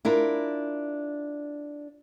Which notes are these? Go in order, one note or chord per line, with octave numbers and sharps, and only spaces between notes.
D4 E4 F4 A#4